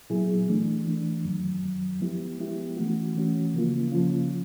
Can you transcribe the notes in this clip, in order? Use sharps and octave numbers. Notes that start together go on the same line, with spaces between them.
A#2 F#3 B3 E4 G#4
E3 A3 D4
E3 A3 D4
F#2 D#3 F#3
F#2 D#3 F#3
F3 G#3 B3 E4 G4
F3 G#3 B3 E4 G4
E3 A3 C#4 F#4
E3 A3 C#4 F#4
C#3 F3 A#3 C#4 F4
C#3 F3 A#3 C#4 F4